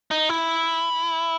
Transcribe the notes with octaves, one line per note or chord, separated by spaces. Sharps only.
D#4
E4